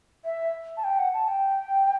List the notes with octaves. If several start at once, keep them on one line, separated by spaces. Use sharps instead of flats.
E5
A5
G5
F#5
A5
G5